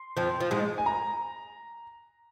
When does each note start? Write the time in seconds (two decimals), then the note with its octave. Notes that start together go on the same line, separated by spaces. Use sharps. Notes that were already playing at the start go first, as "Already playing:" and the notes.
Already playing: C6
0.17 F2 F3
0.40 F3
0.51 G#2 G#3
0.78 G#5
0.86 A#5